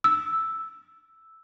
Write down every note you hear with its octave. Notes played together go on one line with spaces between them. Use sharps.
E6